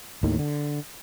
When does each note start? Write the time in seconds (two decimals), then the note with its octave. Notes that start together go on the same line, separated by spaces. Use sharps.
0.23 D#2 A2 D#3
0.39 D3